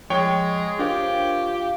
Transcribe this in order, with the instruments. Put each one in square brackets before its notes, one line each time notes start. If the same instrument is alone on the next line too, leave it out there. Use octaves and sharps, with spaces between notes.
[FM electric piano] F3 [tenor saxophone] G#3 [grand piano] C#5 G5
[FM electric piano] D4 A#4 C5 [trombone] F4 [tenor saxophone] G4